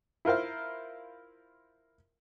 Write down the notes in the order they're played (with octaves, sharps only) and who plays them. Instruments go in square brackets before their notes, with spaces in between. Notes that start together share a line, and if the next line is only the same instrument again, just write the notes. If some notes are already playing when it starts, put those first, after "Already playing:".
[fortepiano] E4 F4 A#4 C5 F5